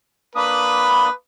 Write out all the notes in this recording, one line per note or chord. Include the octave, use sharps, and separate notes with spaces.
A#3 D4 B4 B5 D#6